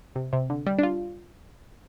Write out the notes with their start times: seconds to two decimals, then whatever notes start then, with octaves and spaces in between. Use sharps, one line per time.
0.16 C3
0.33 C3
0.50 D3
0.66 G3
0.79 D4
0.83 F4